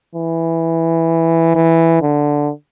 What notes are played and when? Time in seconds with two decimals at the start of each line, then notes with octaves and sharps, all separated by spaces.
0.15 E3
1.55 E3
2.02 D3